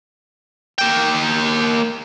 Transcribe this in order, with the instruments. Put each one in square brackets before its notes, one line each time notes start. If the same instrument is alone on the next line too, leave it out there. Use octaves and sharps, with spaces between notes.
[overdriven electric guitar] A#3 G5